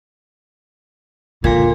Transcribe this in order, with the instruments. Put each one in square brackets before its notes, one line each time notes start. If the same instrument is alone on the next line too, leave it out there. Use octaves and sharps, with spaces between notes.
[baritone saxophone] A#2 [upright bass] D3